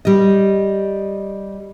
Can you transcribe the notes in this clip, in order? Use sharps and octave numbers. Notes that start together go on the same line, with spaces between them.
G3 D#5